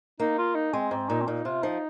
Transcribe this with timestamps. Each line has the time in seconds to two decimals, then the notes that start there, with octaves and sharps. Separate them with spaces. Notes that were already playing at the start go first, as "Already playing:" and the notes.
0.20 A#3 D#4
0.38 F4
0.55 D#4
0.73 G#3 C4
0.91 G#2 C4
1.09 A#2 D#4
1.21 C4
1.27 A#2 D#4
1.45 C3 F4
1.63 F3 D#4